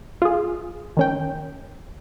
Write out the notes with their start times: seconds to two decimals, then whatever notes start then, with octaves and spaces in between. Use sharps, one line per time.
0.22 F4 G#4
0.97 D#3 C#4 G5